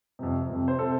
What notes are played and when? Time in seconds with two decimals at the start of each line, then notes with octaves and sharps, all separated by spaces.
0.19 F2 C3
0.50 F2 C3
0.68 C5
0.79 C3 A4